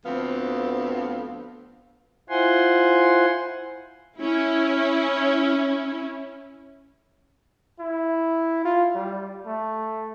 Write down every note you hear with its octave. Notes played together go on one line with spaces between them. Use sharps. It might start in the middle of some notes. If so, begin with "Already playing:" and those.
D2 D3 F3 B3 C4 F5
E4 F4 C5 F#5 G#5 C6
C#4 E4
E4
F4
G3
A3